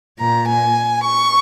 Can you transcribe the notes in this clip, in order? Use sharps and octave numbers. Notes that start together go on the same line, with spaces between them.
A#2 A#5
G#5
C#6